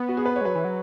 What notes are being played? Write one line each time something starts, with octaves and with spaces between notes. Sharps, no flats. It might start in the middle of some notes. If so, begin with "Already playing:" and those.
Already playing: B3
F#4
G#4
B4
C#5
G#3
F#3 B4
E3
F#3